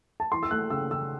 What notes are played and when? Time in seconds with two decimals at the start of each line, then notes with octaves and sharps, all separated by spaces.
0.20 A5
0.32 E3 C6
0.43 E6
0.51 A3 F#6
0.70 C#3 E6
0.91 C#3 E6